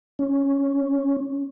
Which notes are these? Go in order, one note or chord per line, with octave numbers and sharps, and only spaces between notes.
C#4